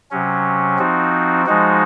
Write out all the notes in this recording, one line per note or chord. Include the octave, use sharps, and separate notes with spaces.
C3 F#3 C#4
F3 C4 D#4 F#4
F3 G#3 D#4 F#4